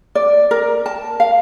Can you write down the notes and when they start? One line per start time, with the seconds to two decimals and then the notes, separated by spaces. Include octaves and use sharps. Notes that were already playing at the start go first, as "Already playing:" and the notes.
0.15 D5
0.51 A#4
0.86 A5
1.20 F5